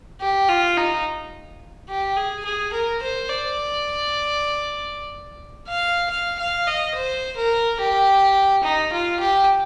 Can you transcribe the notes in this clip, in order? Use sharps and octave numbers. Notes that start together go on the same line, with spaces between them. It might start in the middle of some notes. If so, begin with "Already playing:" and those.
G4
F4
D#4
G4
G#4
G#4
A#4
C5
D5
F5
F5
F5
D#5
C5
A#4
G4
D#4
F4
G4